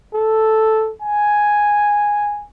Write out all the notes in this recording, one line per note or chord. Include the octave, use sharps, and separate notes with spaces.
A4
G#5